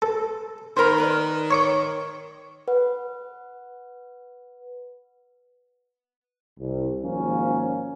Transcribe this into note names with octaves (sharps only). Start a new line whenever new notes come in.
A4
D#3 D#4 A#4 C5 B5
A#4 B4 D5
C#5 C#6 D6
B4 F#5
C2
G#1 F3 A#3 C#4